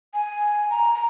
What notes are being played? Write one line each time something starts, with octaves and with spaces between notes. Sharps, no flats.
G#5
A#5
A#5